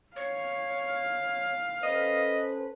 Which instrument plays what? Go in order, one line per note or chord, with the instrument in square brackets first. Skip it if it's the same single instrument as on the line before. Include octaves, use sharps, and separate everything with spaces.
[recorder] C#5 [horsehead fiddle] F5
[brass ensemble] C#4 A4 C5 [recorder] B4 [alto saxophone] D#5